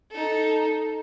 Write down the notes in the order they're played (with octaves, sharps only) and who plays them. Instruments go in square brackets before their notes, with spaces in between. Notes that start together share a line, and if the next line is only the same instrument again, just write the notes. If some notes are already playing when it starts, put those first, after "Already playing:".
[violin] D#4 A4